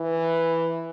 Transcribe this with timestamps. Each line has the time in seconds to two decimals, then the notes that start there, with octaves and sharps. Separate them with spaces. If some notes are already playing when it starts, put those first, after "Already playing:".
Already playing: E3